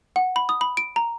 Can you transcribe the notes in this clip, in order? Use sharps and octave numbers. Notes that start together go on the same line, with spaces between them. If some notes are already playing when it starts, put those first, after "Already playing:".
F#5
B5
D#6
B5
D7
A#5